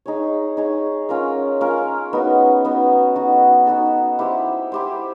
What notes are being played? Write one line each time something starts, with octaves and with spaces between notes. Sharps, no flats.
D#4 G#4 C#5
D#4 G#4 C#5
C#4 F4 A#4
C#4 F4 A#4
B3 D#4 F#4
B3 D#4 F#4
D#4 F#4 A4
D#4 F#4 A4
E4 G4 C5
E4 G4 C5